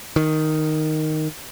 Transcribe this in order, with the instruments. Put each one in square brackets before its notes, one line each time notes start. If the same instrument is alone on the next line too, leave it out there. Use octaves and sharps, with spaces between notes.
[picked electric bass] D#3